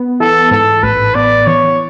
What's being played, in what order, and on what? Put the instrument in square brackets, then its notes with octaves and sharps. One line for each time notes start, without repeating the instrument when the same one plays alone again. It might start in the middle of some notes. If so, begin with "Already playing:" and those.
Already playing: [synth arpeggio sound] B3
[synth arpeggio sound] E3 [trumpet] A4
[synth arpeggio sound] G#2 [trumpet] A4
[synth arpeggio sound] A1 [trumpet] B4
[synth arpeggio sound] B3 [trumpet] D5
[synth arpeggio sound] E3 [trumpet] C#5